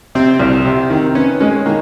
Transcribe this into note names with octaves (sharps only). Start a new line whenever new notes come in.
C3 C4
C2
C3
D#3
B3 C#4
G#3 C#4
D#3 A#3